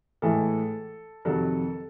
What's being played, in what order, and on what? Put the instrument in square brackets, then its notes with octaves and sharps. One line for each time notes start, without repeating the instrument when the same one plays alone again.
[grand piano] A2 E3 G#3 A4
F2 C3 D#3 F#3 A4